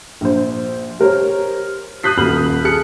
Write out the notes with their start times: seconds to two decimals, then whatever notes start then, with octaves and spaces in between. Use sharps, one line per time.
0.21 A#1 C5
0.99 G4 A#4 C5 C#5
2.04 D#6 F#6 G6 B6 C7
2.17 D#1 F#4 B5 F6 F#7
2.64 G#4 A4 F#6 C#7